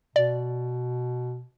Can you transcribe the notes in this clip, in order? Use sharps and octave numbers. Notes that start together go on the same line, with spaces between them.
B2 D5